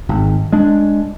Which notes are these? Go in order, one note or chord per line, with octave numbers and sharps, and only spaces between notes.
G#1
G#3 D4